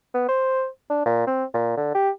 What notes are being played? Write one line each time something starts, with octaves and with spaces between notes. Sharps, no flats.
B3
C5
D4
A#2
C4
A#2
D3
G4